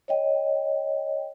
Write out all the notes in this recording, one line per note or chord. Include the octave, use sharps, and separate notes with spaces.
C#5 D#5 G5